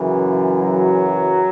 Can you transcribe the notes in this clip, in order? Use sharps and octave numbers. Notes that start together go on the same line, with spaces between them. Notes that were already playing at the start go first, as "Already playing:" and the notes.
Already playing: F#2 C#3 E3
F#3